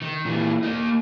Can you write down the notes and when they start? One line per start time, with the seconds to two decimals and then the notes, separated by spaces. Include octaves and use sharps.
0.02 D#3
0.25 A#2 E3
0.63 A#3 D#4